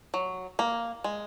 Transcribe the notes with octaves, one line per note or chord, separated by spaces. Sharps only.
F#3
A#3
G#3